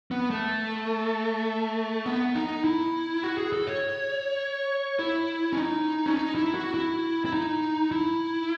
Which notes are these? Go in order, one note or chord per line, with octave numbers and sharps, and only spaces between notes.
B3
A3
B3
D#4
E4
F#4
G#4
A4
C#5
E4
C#4
D#4
C#4
D#4
E4
F#4
E4
E4
D#4
E4